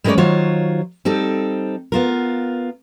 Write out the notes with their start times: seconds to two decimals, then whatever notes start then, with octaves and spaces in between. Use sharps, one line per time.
0.04 G3 G#3 C#4 A#4 C#5 D5
0.17 D#3 F#3 F4 C5 C#5
1.05 G3 C4 D#4 A4
1.92 B3 F4 A#4